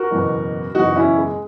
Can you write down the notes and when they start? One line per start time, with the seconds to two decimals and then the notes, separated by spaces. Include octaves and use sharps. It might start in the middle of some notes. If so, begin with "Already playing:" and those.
Already playing: F#4 A#4
0.11 F#1 E2 B2
0.75 F#1 E2 B2 D#4 F#4
0.96 C#4 E4
1.18 G#3